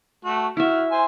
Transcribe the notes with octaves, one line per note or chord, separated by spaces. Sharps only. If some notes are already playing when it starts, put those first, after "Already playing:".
A3 F#4
E4 F#4 E5 F6
C5 G#5